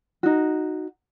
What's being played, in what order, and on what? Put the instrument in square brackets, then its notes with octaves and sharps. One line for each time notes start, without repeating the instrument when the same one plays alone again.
[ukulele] D#4 F#4